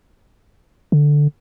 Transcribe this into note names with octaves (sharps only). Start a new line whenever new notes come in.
D3